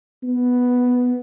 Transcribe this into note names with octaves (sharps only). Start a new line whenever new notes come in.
B3